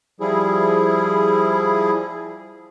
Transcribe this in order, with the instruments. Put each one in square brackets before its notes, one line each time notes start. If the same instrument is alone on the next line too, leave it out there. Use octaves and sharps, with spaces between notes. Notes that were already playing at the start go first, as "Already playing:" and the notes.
[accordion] F3 G3 E4 G#4